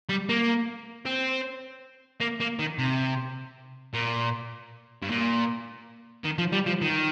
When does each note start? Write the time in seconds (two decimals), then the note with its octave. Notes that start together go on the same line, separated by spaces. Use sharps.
0.09 G3
0.29 A#3
1.06 C4
2.21 A#3
2.40 A#3
2.59 D#3
2.78 C3
3.93 A#2
5.02 G2
5.09 A#2
6.24 D#3
6.38 F3
6.53 G3
6.67 F3
6.82 D#3